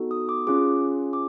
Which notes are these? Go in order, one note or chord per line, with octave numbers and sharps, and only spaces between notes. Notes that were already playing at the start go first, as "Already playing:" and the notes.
Already playing: B3 D#4 F#4 A4
D#6
D6
C#4 F4 G#4 D6
D6